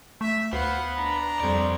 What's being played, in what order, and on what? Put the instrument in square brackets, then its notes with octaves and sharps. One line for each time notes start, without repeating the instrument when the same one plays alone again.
[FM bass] A3 [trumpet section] E5
[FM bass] D2 [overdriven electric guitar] B3 B4 [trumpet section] C5 F5 F#5
[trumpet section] D4 A#5
[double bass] F2 G3 [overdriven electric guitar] C5 D5